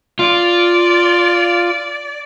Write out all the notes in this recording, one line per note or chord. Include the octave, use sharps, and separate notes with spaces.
F4 D5